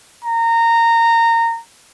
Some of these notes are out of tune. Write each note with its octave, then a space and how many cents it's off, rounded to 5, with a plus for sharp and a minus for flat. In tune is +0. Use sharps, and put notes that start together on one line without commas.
A#5 -20